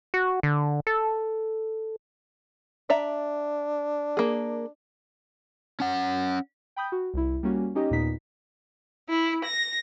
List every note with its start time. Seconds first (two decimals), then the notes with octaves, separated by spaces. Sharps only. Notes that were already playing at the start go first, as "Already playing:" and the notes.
0.14 F#4
0.43 D3
0.87 A4
2.90 D4 D5 E5 A#5
4.17 A#3 G#4
5.80 C#4 F#5
6.76 G5 B5 D#6 G6
6.92 F#4
7.14 C2 E4
7.43 G3 A#3 C#4 F#4
7.75 C#4 D#4 G4 D#5
7.90 D#2 A#2 B3 D#4 B6
9.09 E4
9.45 A#6